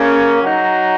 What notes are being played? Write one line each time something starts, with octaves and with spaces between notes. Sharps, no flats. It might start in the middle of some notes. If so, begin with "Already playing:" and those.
Already playing: C#3 A#3 C#4
F#3 D#4 F#4